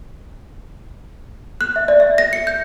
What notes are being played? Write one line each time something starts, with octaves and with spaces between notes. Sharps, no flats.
F#6
E5
D5
E5
A#6
C#7
G6